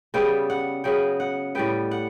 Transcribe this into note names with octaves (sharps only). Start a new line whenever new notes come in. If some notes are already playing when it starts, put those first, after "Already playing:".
C#3 G3 B3 G5
F#5
C#3 F#3 B3 G5
F#5
A2 G3 B3 G5
F#5